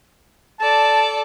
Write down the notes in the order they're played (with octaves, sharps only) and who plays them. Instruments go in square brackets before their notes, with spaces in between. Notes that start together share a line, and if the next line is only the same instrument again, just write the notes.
[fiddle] A4 D5 [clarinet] A5